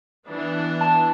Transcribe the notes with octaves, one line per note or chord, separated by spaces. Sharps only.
E3 B3 D4
A5